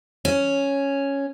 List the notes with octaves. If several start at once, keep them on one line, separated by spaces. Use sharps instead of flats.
C#4